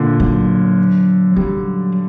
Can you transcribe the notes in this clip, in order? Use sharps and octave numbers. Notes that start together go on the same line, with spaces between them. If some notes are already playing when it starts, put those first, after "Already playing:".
Already playing: A#2 D3
F#3
F#3 G3